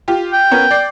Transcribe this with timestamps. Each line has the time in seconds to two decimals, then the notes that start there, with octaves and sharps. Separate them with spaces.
0.08 F4 G4
0.33 G5
0.51 B3 C#4 A#4
0.71 D5 C7